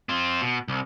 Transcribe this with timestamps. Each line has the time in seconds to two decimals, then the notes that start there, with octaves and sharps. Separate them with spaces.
0.09 C4 F4
0.41 B2
0.68 C2